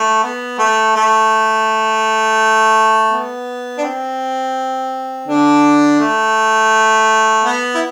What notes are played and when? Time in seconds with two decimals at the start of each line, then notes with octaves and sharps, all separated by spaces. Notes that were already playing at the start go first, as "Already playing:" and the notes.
Already playing: A3
0.23 B3
0.59 A3
0.96 A3
3.11 B3
3.78 D4
3.83 C4
5.28 D3 D4
6.00 A3
7.44 B3
7.75 E4